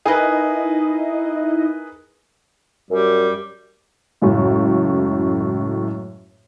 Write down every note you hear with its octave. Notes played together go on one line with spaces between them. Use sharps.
D#4 E4 G#4 A#4 B4 D#5
F#2 G3
C#2 F#2 A2